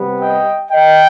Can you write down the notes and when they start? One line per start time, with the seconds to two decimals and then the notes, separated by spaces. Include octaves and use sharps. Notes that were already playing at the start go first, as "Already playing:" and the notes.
Already playing: C3 G3 B3
0.20 D#5 G5
0.72 D#5 G5